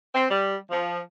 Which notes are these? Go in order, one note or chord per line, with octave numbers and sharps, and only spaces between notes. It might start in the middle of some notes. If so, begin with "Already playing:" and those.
C4
G3
F3